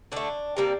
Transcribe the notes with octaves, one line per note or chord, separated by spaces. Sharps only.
D3 A3 D4
C3 G3 A#3